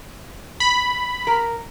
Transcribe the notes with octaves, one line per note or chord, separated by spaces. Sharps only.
B5
A#4